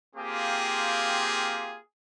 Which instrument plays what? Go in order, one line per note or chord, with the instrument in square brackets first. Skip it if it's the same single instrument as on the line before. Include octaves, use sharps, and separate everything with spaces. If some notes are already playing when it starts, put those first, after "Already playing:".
[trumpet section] A#3 C4 F4 G4 G#4